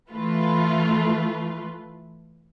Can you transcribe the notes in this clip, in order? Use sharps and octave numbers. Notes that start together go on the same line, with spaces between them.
E3 A3 F4 B4